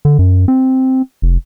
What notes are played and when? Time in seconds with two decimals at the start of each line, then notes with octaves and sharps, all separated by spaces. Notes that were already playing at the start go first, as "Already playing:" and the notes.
0.05 D3
0.19 F#2
0.48 C4
1.22 F1